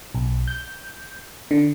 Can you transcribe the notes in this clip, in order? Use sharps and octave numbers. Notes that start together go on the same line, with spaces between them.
B1
G6
D3